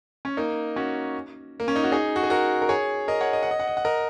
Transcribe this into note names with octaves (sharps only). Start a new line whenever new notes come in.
C#4
A#3 D#4
C#4 F#4
A#3
C#4
D#4
F#4
D#4 G#4
F#4
G#4
F#4 A#4
A#4
G#4 C#5
A#4 D#5
C#5 F#5
D#5
F#5
D#5
F#5
D#5
F#5
A#4 D#5